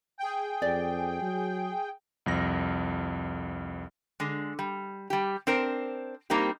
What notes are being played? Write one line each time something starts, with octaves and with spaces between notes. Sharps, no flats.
G#4 G5
F2 D5
F#3
C2 F2 A#6
D3 G#3
G3
G3 G4
C4 D4 A#4 C5
G3 A#3 C4 D#4 G4